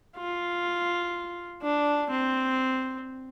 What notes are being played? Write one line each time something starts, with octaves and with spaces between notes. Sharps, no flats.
F4
D4
C4